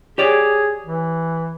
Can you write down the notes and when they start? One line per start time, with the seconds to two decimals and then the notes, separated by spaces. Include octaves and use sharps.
0.18 G4 G#4 C#5 D5
0.85 E3